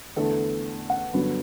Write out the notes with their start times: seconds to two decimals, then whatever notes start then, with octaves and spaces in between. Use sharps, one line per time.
0.16 E2 D3 A3 A4
0.90 F#5
1.14 G2 D3 F#3 B3